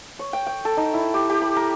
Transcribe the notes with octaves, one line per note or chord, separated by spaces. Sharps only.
C#5
G5
G5
A4
D#4
E4
G4
G4
B5
A#4